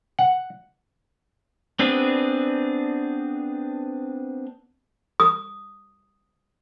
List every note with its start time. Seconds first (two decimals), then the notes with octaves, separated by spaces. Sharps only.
0.19 F#5
1.79 B3 C4 D4 G#4
5.20 D#6